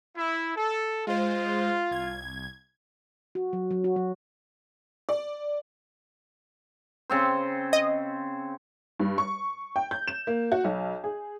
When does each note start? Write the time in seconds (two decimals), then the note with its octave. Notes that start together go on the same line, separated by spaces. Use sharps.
0.16 E4
0.56 A4
1.07 G#3 F4 C5
1.91 C2 G#6
3.35 F#4
3.53 F#3
3.71 F#3
3.84 F#4
3.96 F#3
5.09 D5
7.10 C#3 C4 C5
7.73 D#5
9.00 G2
9.18 C#6
9.76 G5
9.91 G6
10.08 E7
10.27 A#3
10.52 F#4
10.64 B1
11.04 G#4